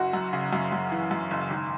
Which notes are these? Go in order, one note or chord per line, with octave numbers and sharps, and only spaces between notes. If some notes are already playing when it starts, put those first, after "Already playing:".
Already playing: F#1 F#4
F#2
C#3
F#2
F#2
E3
F#2
F#1
G#1